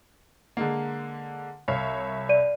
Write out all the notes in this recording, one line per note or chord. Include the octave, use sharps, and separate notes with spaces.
D3 G#3 A#3
C2 C#5 E5 F5
D5 D#7